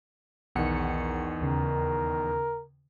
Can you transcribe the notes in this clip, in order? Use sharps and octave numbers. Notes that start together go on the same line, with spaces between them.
B1 E2 D#3 F#5 C#7
D#2 C#3 A#4